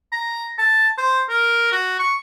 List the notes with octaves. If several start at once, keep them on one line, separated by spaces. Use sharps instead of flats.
A#5
A5
C5
A#4
F#4
C#6